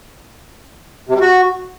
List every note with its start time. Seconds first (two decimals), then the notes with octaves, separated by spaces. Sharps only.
1.09 C3
1.15 G3
1.21 F#4